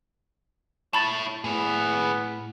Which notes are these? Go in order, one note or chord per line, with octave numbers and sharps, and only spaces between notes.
E4 C#5 A5 B5 A6
A2 B3 G#4 B4